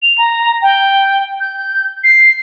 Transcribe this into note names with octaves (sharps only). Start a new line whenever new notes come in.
F7
A#5
G5
G6
C7